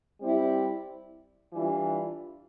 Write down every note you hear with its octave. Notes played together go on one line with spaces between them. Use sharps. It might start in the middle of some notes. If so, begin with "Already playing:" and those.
G3 C4 E4
E3 G3 D4 F4